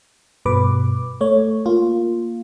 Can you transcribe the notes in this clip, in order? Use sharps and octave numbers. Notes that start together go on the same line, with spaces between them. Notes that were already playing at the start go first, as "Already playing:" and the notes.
G2 B2 B4 D6
A3 C#5
A#3 F4